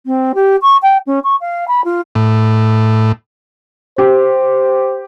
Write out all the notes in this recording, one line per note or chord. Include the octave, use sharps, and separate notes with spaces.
C4
G4
C#6
G5
C#4
C#6
F5
B5
F4
A2
G4 C5